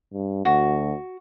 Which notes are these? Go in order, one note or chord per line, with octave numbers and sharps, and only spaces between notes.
G2
D2 F#4